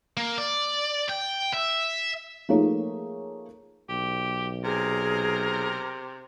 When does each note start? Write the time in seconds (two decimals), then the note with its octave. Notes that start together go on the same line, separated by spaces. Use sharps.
0.17 A#3
0.38 D5
1.09 G5
1.54 E5
2.49 F3 A3 A#3 D#4 G#4 C#5
3.89 B1 G4
4.64 C3 G#4 A#4